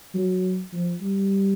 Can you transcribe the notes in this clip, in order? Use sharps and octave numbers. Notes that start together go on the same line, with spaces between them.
F#3
F3
G3